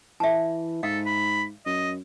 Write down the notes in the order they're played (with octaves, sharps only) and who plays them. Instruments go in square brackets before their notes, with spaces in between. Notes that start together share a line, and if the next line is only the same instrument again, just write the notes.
[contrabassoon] E3 [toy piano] E5 A5
[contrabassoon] G#2 [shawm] A4 [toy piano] F5
[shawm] B5
[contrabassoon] F#2 [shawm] D#5